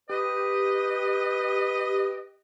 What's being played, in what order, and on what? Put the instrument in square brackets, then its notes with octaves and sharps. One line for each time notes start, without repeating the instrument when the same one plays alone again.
[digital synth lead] G4 [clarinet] B4 [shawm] D#5